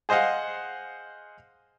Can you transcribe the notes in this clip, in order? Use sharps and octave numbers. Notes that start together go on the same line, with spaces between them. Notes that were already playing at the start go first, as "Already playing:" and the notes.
G#4 C5 D#5 F5 F#5